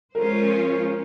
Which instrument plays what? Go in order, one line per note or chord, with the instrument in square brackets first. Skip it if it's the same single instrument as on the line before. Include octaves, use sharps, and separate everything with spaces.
[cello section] F3 G#3 C#4 F4 C5 [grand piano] A#4